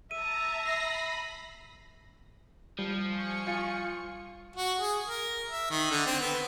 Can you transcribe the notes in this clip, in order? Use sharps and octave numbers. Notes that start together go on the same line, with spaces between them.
E5 A5 A#5 D#7
B5 A#6 C7
F3 G3
G#5 C#6 C#7
F4
F#4
G#4
A#4
E5
D#3
D3
C4
B3